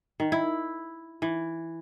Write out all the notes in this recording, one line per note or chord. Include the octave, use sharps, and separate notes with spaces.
D#3
E4
E3